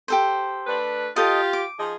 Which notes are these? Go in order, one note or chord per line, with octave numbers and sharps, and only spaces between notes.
G4 A4 C5
A3 D4 B4
F4 G4 A4 D#5
D6
F3 D#4 G#4